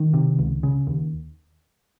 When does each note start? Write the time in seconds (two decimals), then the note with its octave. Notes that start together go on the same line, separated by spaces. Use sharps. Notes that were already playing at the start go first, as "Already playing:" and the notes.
Already playing: D#3
0.14 C3
0.39 C#2
0.63 C#3
0.87 D#2